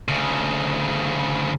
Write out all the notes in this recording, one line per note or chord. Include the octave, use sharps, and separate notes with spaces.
D2 C#3